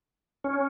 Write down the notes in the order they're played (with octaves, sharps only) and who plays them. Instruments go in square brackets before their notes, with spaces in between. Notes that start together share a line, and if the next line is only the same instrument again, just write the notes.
[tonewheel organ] C#4